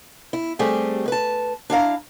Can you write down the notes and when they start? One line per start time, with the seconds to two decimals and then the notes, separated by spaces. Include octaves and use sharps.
0.33 E4
0.59 G3 A3 C4 G4 G#4
1.08 B4 A5
1.70 D4 E4 F5 A#5